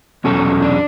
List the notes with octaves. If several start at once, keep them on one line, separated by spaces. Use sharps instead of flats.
E2 B2 F#3 C#4 F#4 A4
D4